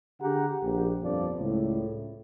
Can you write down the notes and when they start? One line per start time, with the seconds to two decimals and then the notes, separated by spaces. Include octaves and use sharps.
0.22 D3 G4 G#4 F#5 A#5
0.64 A#1 G4
1.03 G1 F2 D3 F3 D5
1.39 C#2 A2